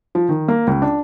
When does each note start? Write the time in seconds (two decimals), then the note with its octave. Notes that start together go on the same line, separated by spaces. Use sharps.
0.15 F3
0.29 D#3
0.48 A#3
0.67 C#2
0.82 D4